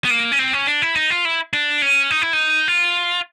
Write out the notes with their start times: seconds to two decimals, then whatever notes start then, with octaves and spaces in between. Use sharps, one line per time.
0.04 B3
0.10 A#3
0.32 C#4
0.39 C4
0.53 C#4
0.67 D4
0.82 E4
0.96 D#4
1.10 F4
1.25 E4
1.54 D4
1.82 C#4
2.11 D#4
2.22 E4
2.33 D#4
2.68 F4